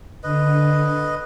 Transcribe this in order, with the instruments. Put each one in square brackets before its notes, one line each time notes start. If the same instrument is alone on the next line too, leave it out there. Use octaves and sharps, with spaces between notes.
[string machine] D3 [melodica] B4 D#5